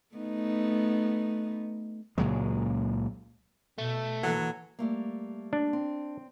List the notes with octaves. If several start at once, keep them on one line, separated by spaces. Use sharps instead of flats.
A3 B3 D#4
C#2 A#2 F#3 G#3
B2 A3
E3 F#3 A#3 A4 F#5
G3 A3 A#3
D4
C4